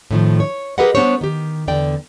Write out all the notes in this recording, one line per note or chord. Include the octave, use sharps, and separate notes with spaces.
A2 D#3 F3
C#5
G4 G#4 A#4 B4 D#5 F#5
G3 B3 D4 C5 C#5
D#3 G4
E2 D3 D5 G5